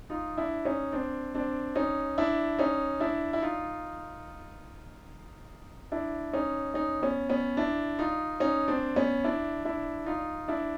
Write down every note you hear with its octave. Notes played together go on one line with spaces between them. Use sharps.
D#4 F4
D4 E4
C#4 D#4
C4 D4
C4 D4
C#4 D#4
D4 E4
C#4 D#4
D4 E4
E4
D#4 F4
D4 E4
C#4 D#4
C#4 D#4
B3 C#4
B3 C#4
D4 E4
D#4 F4
C#4 D#4
C4 D4
B3 C#4
D4 E4
D4 E4
D#4 F4
D4 E4